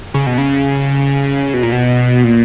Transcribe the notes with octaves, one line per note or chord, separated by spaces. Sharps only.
C#3
B2
C#3
B2
A#2
B2
A#2